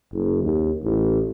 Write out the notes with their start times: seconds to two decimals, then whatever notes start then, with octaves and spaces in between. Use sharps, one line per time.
0.13 F#1
0.43 D#2
0.83 A1